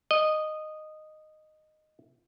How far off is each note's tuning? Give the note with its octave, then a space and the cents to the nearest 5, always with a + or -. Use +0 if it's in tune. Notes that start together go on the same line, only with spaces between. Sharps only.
D#5 -10